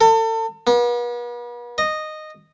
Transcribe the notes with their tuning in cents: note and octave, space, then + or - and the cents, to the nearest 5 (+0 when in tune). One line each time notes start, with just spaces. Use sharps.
A4 +35
B3 -40
D#5 -10